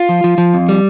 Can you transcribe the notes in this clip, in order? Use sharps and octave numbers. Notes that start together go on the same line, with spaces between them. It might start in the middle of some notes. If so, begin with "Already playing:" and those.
Already playing: F4
F3
F3
F3
F2
G3